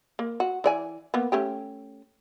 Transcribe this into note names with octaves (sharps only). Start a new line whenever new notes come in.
A#3
F#4
E3 D5 G#5
A#3 B3
A3 C#4 G4